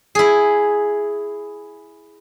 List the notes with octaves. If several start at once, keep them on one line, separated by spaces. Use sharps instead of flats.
E4 G#4